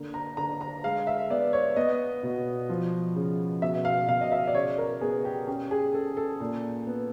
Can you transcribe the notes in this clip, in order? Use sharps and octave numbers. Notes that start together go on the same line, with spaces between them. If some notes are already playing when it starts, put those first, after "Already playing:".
Already playing: D3 A#3
A#5
D3 A#5
A#5
G#3 F5
E5
B3 D5
C#5
B3 D#5
B2
F3
C#3
B2 E5
F5
B2 F5
D#5
E5
D5
C#3 C#5
A#4
B3 G#4
G4
C#4 G4
G#4
C#4 A4
A4
A#2
B3